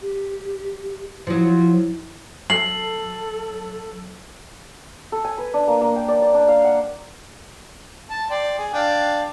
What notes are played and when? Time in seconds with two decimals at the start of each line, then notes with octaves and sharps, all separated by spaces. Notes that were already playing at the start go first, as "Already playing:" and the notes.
0.01 G4
1.27 F3 F#3 E4
2.50 F#3 A4 C7 F#7
5.12 A4
5.25 G#5
5.38 B4
5.54 D4
5.67 A#3
5.81 A#3
5.96 G5
6.08 D5
6.22 D5
6.34 D4
6.48 F5
6.64 F#5
8.10 A5
8.30 D5 G5 C6
8.58 G#4
8.73 D4 F5 G5